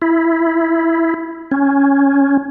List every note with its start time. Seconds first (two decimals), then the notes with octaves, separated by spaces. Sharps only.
0.02 E4
1.52 C#4